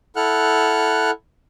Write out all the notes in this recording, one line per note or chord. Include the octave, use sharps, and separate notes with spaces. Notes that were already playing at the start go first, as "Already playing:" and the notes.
E4 A4 F#5 F6 F#6